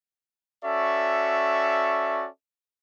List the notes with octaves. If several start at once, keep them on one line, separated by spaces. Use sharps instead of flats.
C#4 F#4 A4 D5 E5 C#6